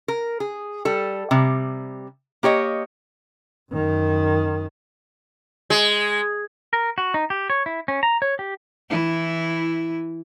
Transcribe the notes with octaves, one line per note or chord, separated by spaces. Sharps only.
A#4
G#4
G3 A4
C3 G3
A#3 G4 C#5 D#5
F#2 D#3
G#3
A#4
F#4
D#4
G4
C#5
E4
C#4
A#5
C#5
G4
E3 E4